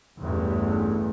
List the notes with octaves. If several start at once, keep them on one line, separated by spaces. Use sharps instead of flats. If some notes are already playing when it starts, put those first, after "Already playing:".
A1 E2 G2